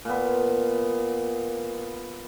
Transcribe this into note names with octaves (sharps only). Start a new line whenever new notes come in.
A#2 B3